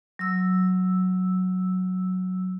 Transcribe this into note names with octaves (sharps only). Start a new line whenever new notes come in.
F#3 E6